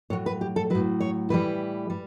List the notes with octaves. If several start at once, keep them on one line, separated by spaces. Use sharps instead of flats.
A2 F#3 C#5
B4
G4
A4
A2 F#3 B4
C#5
A2 E3 G3 B4
G3